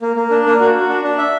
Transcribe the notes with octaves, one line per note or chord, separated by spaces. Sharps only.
A#3
A#3
D4
A#3
F#4
F#4
D4
D4
E5